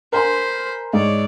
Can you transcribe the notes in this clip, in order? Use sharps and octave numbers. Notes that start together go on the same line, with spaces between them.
A#4 C5 G#5 B5 C6
G#2 C#5 D5